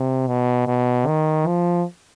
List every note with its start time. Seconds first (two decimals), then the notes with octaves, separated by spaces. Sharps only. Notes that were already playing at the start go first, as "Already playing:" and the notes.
Already playing: C3
0.27 B2
0.67 B2
1.07 D#3
1.47 F3